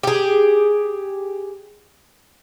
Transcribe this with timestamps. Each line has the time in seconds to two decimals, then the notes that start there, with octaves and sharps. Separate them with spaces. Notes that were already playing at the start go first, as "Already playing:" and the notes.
0.03 G4 G#4